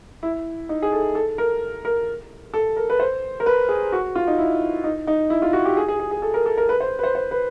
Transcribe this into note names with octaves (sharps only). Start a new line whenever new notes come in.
E4
D#4
G#4
A4
A4
A#4
A#4
A4
A#4
B4
C5
A#4
B4
G#4
F#4
F4
D#4
E4
D#4
D#4
E4
F4
F#4
G4
G#4
G#4
G#4
G#4
A4
A#4
A4
A#4
B4
C5
B4
C5
C5
B4